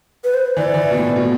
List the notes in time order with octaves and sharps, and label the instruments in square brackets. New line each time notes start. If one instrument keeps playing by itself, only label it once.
[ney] B4
C5
[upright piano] E3 [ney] D5
[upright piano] E3
B2
A2
B2